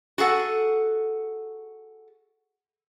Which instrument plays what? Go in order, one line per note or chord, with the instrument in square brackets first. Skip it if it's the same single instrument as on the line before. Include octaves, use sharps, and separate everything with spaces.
[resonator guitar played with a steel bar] F#4 G#4 A4 F#5